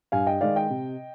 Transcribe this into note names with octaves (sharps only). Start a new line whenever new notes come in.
G2 F5 G#5
D#5 G5
D#3 G#3 D5 F5
D#5 G5
C3